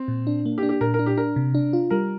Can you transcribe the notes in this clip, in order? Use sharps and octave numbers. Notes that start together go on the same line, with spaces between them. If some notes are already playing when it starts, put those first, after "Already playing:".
Already playing: C4
A#2
D4
A#3
G4
D4
G4
A#2 A#4
A#4
D4
G4
D4 A#4
C3
D4
F4
G3 A#4